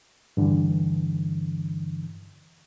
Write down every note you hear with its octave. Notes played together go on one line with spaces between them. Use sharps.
G2 D3 E3